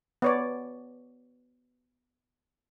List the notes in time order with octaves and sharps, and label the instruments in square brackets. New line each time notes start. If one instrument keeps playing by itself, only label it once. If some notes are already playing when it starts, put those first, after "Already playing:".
[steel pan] B3 C#5 D5